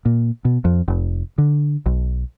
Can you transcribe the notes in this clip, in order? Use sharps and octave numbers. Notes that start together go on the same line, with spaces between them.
A#2
B2
F2
F1
D3
B1